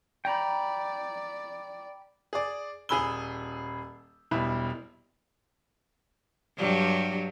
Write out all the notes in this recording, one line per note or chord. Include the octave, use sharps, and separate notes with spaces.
D5 G5 A#5 B5
G#4 D5
D#1 G#4 G#5 B5 E6 G7
E1 B2 G3 E4
G2 F#3 G3